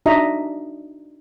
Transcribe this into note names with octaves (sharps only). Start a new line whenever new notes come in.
D4 D#4 F#4 D#5 E5 A#5